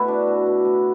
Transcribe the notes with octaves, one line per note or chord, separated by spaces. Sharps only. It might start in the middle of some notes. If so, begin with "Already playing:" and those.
Already playing: B2 A3 E4 F#4
D4
B2
B2
A2